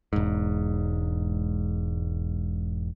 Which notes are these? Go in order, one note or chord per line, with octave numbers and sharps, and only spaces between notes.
E1 G#2